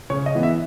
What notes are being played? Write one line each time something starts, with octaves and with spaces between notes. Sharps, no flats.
C#3 C#5
D#5
E3 B3
E5